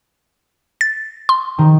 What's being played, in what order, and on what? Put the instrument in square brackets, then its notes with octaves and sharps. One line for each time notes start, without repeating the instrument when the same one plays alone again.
[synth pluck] A6
C6
[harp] D#3